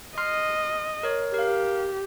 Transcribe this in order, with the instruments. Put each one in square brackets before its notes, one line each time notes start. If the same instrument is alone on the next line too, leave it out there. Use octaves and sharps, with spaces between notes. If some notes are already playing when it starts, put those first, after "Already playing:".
[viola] D#5 [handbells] C6 F6 C7
[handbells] A#4 C#5
[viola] G4 [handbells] A#4 F5